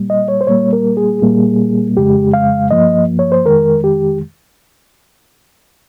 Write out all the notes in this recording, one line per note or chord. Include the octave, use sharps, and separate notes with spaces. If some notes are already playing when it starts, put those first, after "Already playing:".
Already playing: A#2 G3 A#3
D#5
C#5
C5
A#2 G3 A#3 C#5
A#4
G#4
A#2 G3 A#3
F2 C#3 G#3 G4
F5
G2 F3 A#3 D#5
C#5
C5
F2 D#3 G#3 A#4
G4